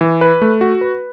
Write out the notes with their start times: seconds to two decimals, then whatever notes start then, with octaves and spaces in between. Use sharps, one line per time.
0.01 E3
0.21 B4
0.42 A3
0.61 F#4
0.81 B4